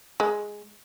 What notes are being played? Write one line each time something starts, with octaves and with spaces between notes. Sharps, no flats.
G#3